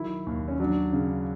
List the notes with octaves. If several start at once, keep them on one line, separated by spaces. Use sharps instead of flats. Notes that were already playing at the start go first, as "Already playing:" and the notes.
Already playing: D#3 F#3 E4
D#2
C#4
F#3 D4
C#3